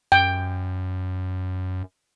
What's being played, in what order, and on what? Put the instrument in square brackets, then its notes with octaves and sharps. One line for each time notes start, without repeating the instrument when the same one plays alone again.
[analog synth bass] F#2 [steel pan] G5